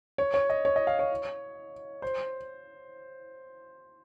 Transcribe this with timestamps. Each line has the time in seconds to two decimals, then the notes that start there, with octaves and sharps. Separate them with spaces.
0.18 C#5
0.34 C#5
0.50 D#5
0.65 C#5
0.76 D#5
0.87 F5
0.99 C#5
2.02 C5